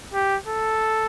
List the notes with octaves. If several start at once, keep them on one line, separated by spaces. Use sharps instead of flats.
G4
A4